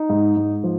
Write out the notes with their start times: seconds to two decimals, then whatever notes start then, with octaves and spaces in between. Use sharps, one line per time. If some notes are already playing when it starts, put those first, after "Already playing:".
Already playing: D#4
0.10 G#2
0.37 G#2
0.64 F3